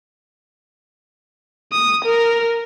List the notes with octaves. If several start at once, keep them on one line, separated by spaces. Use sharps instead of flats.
D#6
A#4